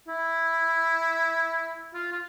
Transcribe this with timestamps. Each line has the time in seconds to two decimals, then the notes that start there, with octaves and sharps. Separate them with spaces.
0.08 E4
1.94 F4
2.12 F4